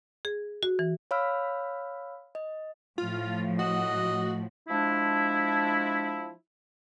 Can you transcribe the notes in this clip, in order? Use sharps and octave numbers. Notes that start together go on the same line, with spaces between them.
G#4
F#4
E3
C#5 F5 B5 E6 F6
D#5
A2 F3 F4
F#4 D#5
F3 G#3 D4 E4